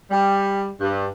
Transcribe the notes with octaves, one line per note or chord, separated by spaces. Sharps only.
G3
G2